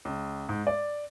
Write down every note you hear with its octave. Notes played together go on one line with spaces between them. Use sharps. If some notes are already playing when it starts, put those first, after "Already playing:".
C#2
G#2
D5